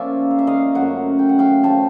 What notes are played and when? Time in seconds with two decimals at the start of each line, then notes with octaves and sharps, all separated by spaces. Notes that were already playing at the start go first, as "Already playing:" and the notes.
Already playing: F3 A#3 C#4 F4 D5 E5
0.31 F5
0.39 E5
0.47 D#5 F5
0.75 F#2 C#3 F#3 A3 E5 F#5
1.19 G5
1.29 F#5
1.39 F5 G5
1.63 C#3 F3 A3 G5 A5